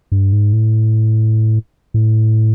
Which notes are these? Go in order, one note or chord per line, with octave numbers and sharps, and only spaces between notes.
G2
G#2
A2
A2